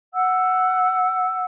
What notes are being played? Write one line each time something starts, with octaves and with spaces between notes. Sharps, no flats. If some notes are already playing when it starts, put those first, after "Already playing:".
F#5 E6